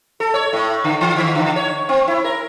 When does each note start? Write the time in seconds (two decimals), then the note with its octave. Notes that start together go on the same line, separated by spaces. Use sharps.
0.20 A4
0.34 C#5
0.53 A2
0.84 D3
1.01 E3
1.16 D#3
1.35 D3
1.56 C#5
1.89 C4
2.08 E4
2.24 A#4